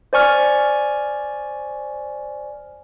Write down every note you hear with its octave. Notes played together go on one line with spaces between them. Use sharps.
C5 D5 G#5 C#6 F6